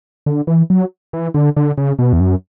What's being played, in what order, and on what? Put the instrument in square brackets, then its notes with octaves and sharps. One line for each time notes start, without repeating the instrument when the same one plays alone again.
[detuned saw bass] D3
E3
F#3
E3
D3
D3
C#3
B2
E2
F#2